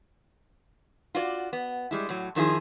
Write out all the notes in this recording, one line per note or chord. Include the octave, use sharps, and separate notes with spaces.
F4 F#4 C#5 D5
B3
G3 G#3 E4
A2 F#3
F2 D#3 F3 E4 G#4